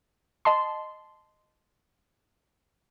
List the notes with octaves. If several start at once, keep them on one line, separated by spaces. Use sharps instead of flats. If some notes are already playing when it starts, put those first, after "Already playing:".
D#5 A5 C6